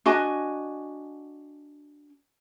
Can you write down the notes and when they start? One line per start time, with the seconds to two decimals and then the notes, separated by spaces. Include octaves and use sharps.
0.06 D4 F#4 D#5 G#5